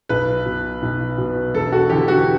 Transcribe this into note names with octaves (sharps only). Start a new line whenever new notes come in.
B1 B4
B2
B1
B2
E1 A4
F#4
E2 D3 G4
F#4